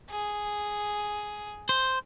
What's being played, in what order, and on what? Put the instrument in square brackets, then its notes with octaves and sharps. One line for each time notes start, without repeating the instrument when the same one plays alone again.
[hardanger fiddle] G#4
[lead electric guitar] C5